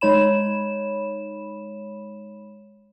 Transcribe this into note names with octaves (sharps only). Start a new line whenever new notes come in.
G#3 D#4 C#5 B5 E7